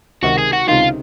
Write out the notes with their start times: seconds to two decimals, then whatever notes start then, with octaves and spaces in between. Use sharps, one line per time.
0.22 C#2 C3 D#3 F#4
0.38 G#4
0.53 F#4
0.69 C#2 C3 D#3 F4